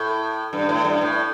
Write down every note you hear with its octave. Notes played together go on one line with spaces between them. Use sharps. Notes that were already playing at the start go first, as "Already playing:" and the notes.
Already playing: A2
G2
A2
G2
A2